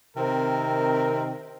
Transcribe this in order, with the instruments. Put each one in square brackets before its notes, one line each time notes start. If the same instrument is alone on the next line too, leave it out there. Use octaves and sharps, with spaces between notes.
[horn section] C3 D#3 C4 A#4